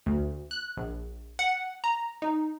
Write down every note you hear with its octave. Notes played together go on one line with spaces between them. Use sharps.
D2
F#6
A#1
F#5
A#5
D#4